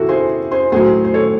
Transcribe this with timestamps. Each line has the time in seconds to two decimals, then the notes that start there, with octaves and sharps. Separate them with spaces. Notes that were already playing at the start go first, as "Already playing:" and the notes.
Already playing: C3 G#3 E4 F#4 A4
0.09 G#4 C5
0.51 G#4 C5
0.72 A2 F#3 G#4 C5
1.04 C5
1.14 A4 C#5